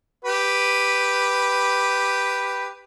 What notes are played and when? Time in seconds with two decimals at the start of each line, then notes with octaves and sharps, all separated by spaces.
0.25 G4 B4